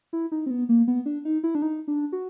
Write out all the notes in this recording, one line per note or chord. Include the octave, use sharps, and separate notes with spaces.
E4
D#4
C4
B3
A#3
B3
D4
D#4
E4
D4
D#4
D4
F#4